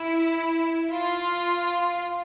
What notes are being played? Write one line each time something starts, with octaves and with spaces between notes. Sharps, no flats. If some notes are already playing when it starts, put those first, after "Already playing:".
Already playing: E4
F4